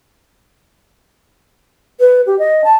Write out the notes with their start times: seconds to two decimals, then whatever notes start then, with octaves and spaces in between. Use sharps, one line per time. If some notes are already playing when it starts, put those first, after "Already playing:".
2.00 B4
2.26 G4
2.39 D#5
2.64 A5